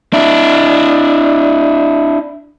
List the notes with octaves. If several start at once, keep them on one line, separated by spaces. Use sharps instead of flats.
D4 E4